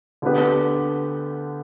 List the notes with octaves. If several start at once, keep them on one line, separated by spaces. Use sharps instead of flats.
D2 D3 B3 G4 B4